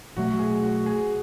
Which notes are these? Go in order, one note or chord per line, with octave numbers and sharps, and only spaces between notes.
B2 F#3 A3 F#4
G#4
F#4
G#4